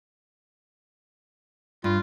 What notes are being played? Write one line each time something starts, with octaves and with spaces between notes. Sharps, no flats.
G2 F4